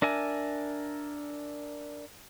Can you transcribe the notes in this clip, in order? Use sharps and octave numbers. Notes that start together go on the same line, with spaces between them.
D4 A#4 E5 G#5